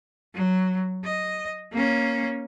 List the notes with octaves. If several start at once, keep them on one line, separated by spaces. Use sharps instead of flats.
F#3
D#5
A#3 C#4